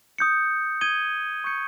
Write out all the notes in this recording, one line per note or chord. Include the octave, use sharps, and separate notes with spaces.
D#6 G6 C#7
D#6 G#6 D#7 G7
C#6 G6 C#7